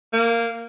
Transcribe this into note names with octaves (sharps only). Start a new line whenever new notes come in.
A#3